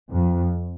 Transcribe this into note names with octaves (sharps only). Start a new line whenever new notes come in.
F2